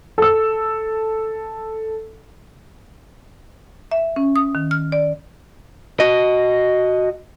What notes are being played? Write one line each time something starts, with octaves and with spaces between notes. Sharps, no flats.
A4 E6
E5
C#4
D#6
D#3
F6
D5
F#4 D#5